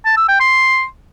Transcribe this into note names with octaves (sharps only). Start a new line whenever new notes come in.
A5
E6
G5
C6